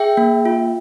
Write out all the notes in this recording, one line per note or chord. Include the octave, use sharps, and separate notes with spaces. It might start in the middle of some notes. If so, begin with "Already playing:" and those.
Already playing: G#4 E5 G5
A#3
F4